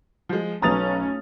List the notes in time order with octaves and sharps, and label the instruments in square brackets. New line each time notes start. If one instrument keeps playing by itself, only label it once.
[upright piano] F3 G#3
[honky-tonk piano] B1 B4 A#5 [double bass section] A3 C#4 [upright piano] D#6 A6 F7